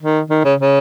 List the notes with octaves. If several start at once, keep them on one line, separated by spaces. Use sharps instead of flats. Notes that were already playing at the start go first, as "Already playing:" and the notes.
D#3
D#3
C#3
C#3